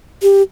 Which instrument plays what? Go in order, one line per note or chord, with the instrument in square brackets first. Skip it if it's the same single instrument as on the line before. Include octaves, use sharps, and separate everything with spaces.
[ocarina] G4